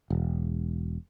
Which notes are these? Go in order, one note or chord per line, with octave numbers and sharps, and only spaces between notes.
E1